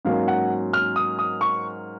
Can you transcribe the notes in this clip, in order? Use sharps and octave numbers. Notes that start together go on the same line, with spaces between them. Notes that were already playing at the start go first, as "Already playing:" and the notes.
G#2 F#3 A#3 C#4 F5
F#5
F6
D#6
D#6
C#6